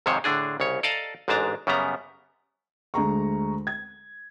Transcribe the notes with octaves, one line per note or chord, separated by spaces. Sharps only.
F2 G#2 C3 D#3 C5 C#5
A2 D3 D4 G#4
C2 C#3 C#5
A4 D5 D#5 F5 A5 A#5
A1 G#2 G#3 D4 A5 A#5
F#2 C#3 G3 B3 A#5
D2 G#3 A#5 C#6
G#6